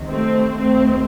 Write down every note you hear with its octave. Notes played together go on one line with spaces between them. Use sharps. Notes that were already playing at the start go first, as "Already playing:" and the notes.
Already playing: C2 C3 D#3
A3 C4
D2 C3 D#3 A3 C4